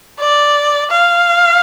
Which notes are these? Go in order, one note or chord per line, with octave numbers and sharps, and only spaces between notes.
D5
F5